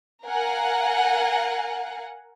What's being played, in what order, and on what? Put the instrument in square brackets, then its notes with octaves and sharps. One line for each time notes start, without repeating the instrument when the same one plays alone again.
[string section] A#4 F5 F#5 G#5